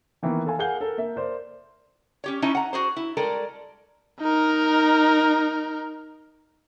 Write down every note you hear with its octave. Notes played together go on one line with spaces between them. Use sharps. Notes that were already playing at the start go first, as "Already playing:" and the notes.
D#3 E3 A#3 B3
A4 F5 G#5
G#4 A#4 F5 F#5 G6 G7
A4 A#4
A#3 E5
A#4 C5 D5
C#4 G4 C#5
C#4 D#4 E4 C#5 A5
F#5 A#5
F#4 G#4 C5
E4
G3 G#3 A4 A#4
D#4 A#4